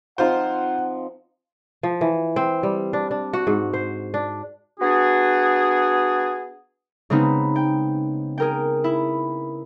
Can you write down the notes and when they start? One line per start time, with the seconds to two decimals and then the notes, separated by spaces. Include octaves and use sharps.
0.18 F3 C4 D#4 F4 C5 F#5
1.83 F3
2.01 E3
2.36 C4
2.63 G3
2.93 D4
3.11 D4
3.33 F#4
3.47 G#2
3.73 C5
4.14 D4
4.80 B3 D4 F#4 G#4
7.10 C#3 G#3 B3 C4 D#4
7.56 G5
8.38 G#4 A#4 G5
8.84 E4